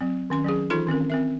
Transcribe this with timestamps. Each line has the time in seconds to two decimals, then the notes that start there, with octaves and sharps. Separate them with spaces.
0.01 F#3 C4
0.30 D#3 C#4 C6
0.44 F#3 C#4 G#4
0.70 E3 D#4 F4 A4 C6
0.87 D#3 C4 C#4 A#4
1.10 C4 A#4 E5